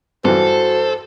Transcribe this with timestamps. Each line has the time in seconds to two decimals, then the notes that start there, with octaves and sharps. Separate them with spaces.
0.25 G2 E3 F#4 A4 C5